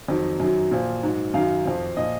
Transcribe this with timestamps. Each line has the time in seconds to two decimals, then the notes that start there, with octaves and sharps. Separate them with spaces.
0.08 F2 D#3 F#3
0.40 F#2 D#3 F#3
0.71 A#2 F3
1.03 G#2 F#3
1.34 F#2 D#3 F#3 F5
1.65 F2 F3
1.97 A#2 F3 D#5